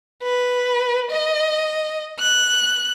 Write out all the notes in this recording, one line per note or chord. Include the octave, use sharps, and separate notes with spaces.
B4
D#5
F#6